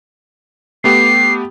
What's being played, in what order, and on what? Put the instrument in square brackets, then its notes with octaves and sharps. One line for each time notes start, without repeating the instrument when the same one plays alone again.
[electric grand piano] A3 B3 G4 [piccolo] C7